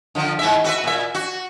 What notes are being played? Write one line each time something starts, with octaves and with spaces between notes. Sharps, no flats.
D3 F3
G#2 E3 E5
F#4 B4 E5
A#2 E5
F#4